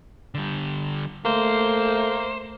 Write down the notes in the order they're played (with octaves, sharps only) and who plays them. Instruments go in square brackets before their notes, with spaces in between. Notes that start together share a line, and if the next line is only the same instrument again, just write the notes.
[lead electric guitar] D3 G3
[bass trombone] A3 [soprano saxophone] A#3 [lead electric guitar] C5